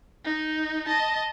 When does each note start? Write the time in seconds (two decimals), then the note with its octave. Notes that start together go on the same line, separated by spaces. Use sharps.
0.25 D#4
0.86 D#5 A5